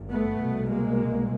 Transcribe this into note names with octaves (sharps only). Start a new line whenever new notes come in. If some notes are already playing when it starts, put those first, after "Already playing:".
Already playing: G#1 G2
A3 B3
C2 B2
G#3 A#3